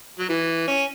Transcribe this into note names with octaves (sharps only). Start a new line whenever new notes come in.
F#3
E3
C#4